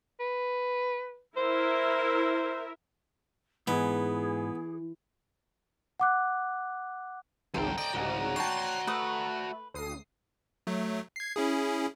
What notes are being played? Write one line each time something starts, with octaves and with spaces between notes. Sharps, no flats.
B4
E4 A#4 C5 E5
G#2 E3 B3 G#4
F#5 D6 F#6
G#1 C#2 F#2 A4 C5 G5 A5 A#5
D5 D#5 G5
C2 G#2 C#3 F#4 D5
C#5 G5 A5 C6 F#6 G#6
A3 B4 D#6
D2 D#6 C7
F#3 A3
G#6 C7
C#4 E4 G#4